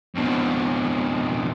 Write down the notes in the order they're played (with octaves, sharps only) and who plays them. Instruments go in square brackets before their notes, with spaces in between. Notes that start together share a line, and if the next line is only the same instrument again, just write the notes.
[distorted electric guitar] F2 B2